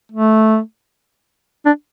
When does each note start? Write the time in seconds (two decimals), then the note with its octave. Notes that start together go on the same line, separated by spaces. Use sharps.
0.12 A3
1.65 D4